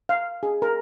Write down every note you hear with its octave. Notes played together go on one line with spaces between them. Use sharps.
F5
G#4
A#4